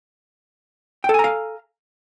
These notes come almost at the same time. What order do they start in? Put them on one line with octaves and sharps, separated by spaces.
G5 A4 G#5 A#5 F5